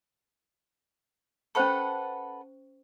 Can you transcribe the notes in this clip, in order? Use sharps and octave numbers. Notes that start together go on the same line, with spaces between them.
C#4 A4 B4 C5 F#5 C#6